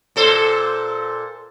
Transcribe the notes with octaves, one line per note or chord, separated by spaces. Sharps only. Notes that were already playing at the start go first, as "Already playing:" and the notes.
A#2 A4 C5